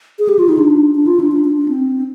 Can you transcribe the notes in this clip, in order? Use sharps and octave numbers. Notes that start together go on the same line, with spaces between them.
G#4
G4
F4
D#4
D4
D4
F4
D4
D4
D4
D4
C4